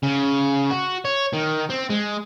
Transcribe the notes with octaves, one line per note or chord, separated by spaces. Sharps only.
C#3
F#4
C#5
D#3
C4
G#3